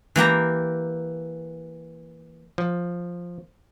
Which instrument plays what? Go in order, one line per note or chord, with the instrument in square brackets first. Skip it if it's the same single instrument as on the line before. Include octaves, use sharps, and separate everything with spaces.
[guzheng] E3 A#3 G4 A#5
[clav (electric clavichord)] F3